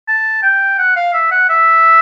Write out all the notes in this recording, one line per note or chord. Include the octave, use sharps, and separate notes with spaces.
A5
G5
F#5
F5
E5
F#5
E5